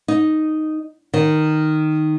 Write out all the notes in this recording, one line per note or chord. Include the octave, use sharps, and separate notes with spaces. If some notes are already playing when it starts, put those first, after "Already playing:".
D#4
D#3